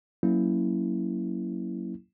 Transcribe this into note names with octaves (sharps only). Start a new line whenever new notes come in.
F#3 A#3 C#4 E4